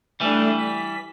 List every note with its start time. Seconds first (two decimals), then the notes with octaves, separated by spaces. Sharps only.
0.20 E3 G3 A3 D4
0.58 B6